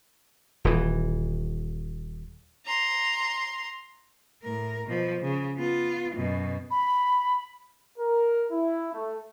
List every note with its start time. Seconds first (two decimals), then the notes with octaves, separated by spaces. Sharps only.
0.64 D#1 E3
2.66 A#5 C6
4.43 A2 A#4
4.87 B2 F3
5.22 C#3
5.58 B3 F4
6.15 F#2 B2
6.71 B5
7.99 A#4
8.51 E4
8.94 A3